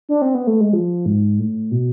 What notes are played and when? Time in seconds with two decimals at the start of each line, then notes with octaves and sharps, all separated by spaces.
0.09 D4
0.22 C4
0.35 B3
0.47 A3
0.60 G#3
0.73 F3
1.06 G#2
1.39 A2
1.71 B2